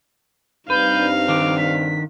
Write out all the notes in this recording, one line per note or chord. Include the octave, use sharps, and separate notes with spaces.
G2 C4 D#4 B4 F5 G6
D#3 D4 D6
B6